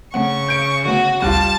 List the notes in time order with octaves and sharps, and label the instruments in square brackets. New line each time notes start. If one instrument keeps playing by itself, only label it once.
[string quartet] C#3 [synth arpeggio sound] A3 C4 F#5 [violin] C#6
[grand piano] G6 D7
[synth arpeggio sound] D3 A3 B3 [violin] F#4
[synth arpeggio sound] G#1 D2 F#6 [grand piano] G3 F4 [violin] A5